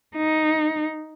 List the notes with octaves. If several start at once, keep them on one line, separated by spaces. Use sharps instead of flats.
D#4